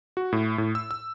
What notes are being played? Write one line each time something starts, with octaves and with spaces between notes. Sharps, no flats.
F#4
A2
A2
E6
E6